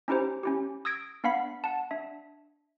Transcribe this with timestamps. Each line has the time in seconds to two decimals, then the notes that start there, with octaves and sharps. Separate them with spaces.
0.08 C#4 D#4 E4 G4 C5
0.43 C#4 E4 G4
0.85 D#6 E6 G#6 A#6 D7
1.24 B3 D4 F5 F#5 B5 B6
1.64 F#5 A5
1.91 D4 E5